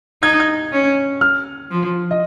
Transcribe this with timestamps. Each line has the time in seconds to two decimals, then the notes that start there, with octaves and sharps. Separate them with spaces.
0.22 D#4 G#6
0.40 G#6
0.72 C#4
1.21 F6
1.71 F3
2.11 D#5